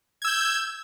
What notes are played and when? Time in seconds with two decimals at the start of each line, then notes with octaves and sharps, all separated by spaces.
0.22 G#6
0.25 E6
0.27 G6